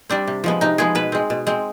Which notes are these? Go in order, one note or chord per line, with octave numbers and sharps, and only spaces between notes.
G3 C4 D4
C3
F3 G#3 B3
C3 D#4
F3 G#3 B3 G#4
B2 B4
G#3 C4
B2
G#3 C4